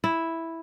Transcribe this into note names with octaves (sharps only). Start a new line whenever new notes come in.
E4